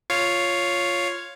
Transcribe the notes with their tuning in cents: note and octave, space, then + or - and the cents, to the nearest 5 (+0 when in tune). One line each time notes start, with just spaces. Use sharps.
F4 +0 C#5 +0 F5 +0